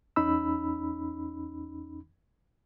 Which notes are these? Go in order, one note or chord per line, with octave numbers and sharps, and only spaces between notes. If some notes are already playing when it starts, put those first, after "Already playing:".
E2 C#4 D#4 B5 E6